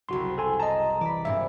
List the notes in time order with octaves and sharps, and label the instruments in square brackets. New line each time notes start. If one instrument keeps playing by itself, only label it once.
[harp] F#1 C2 [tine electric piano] F#4 C6
[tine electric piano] A4 G#5 C6
[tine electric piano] D#5 A5 [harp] A#5
[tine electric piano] E3 [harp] D5 B5
[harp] G2 A#2 C4 [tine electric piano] E5